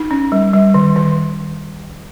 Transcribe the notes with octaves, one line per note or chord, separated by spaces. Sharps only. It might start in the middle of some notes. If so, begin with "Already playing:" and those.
Already playing: D#4
C#4
G3
G3
D#3
D#3